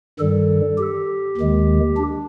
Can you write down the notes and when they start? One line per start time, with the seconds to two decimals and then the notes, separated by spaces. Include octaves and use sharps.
0.19 G2 D#3 G3 A4
0.78 G4
1.38 D#2 D#3 G#3
1.97 D4